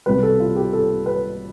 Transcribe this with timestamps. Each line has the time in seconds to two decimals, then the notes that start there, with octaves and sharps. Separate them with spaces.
0.06 C2 B2 G3 B4
0.23 A4
0.40 F4
0.56 G4
0.73 A4
1.06 B4